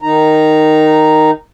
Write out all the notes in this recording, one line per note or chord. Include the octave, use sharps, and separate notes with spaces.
D#3 D#4 A#5